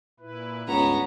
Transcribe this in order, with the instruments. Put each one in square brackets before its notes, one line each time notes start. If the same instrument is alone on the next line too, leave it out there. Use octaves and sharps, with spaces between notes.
[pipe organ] A#2 E4 B4
[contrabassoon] C#2 [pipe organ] G2 [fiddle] B3 C#4 [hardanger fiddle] A#5